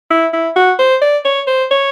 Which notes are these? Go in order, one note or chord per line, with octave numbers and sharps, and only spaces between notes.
E4
E4
F#4
C5
D5
C#5
C5
C#5